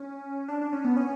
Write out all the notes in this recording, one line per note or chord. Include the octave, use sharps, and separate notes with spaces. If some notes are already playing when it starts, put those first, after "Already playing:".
Already playing: C#4
D4
D4
C#4
B3
C#4